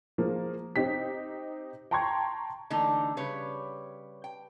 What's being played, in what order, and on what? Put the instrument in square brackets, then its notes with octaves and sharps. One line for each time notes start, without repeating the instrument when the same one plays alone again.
[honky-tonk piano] F3 G#3 A#3
C4 D#4 G4 B6
G5 A5 A#5 C6 C#6 G#6
[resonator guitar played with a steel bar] D3 E3 A3 A#3 D#4
C#3 G3 B4 C#5
G5